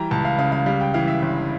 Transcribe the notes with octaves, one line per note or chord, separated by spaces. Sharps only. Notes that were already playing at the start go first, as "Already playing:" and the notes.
Already playing: E3 G3 G5 A#5
C#2 A5
F5
C#3 F5
F5
G3 F5
G5
E3 F5
E5
G1